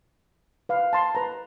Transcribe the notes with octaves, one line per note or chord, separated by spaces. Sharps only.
B4 F5
A5 C6
B4 A#5